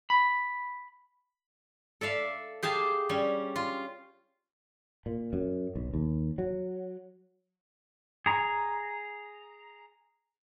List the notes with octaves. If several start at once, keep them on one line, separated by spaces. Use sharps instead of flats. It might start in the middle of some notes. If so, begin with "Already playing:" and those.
B5
A4 D5 E5 F5
G4 G#4 F5 A5
G3 C#4
F4
A#2
F#2
B1
D#2
F#3
G#4 A#5